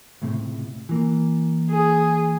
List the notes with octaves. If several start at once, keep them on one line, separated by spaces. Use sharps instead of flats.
C#2 A2 C3
E3 A#3
G#4